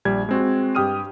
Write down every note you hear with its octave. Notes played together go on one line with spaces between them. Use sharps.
A#1 G3 G#6
G#3 C4 F#4
G2 G4 G5 D#6 F6 D#7